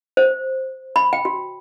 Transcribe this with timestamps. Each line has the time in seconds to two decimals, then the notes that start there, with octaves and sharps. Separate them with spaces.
0.17 C5
0.96 B5
1.13 G5
1.25 F#4